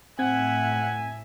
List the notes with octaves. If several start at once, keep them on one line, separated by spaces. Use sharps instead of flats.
A2 C4 E5 F#5 G#5 G#6